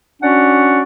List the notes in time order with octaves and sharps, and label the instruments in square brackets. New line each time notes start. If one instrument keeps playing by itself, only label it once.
[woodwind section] C#4 D4 F#4 D5 F#5